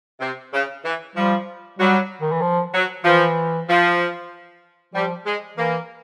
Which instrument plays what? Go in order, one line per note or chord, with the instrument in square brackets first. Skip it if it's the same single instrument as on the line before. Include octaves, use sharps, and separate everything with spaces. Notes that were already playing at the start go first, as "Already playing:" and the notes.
[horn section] C3
C#3
E3
[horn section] F3 [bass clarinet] G3
[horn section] F#3 [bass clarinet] G3
[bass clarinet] D#3
E3
F3
[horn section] F#3
[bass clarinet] E3 [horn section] F3
[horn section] F3
[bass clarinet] F3 [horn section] G3
[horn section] G#3
[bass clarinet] E3 [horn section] A#3